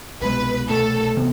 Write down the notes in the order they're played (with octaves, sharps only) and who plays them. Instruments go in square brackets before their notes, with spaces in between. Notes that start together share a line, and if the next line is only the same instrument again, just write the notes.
[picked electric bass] C2 B2 G#3 [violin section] B4
[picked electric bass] C2 B2 A3 [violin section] A4
[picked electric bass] C3 E3 B3